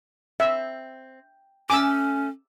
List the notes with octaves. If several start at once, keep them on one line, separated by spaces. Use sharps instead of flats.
C4 E5
A3 C#4 G#5 D6 E6